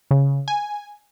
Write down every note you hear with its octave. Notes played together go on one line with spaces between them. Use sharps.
C#3
G#5